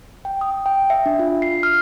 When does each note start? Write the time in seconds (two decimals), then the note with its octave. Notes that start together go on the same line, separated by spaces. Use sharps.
0.25 G5
0.41 D#6
0.66 G5
0.90 E5
1.06 D4
1.19 F4
1.42 C7
1.63 F6